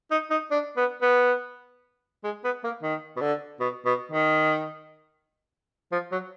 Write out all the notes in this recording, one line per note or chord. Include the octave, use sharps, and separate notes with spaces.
D#4
D#4
D4
B3
B3
G#3
B3
A#3
D#3
B2
D3
B2
B2
D#3
F3
F#3